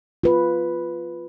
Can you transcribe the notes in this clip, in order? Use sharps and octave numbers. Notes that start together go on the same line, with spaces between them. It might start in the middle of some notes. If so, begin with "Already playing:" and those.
F4 B4